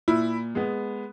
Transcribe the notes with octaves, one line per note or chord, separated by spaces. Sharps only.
A#2 E4
G#3 B3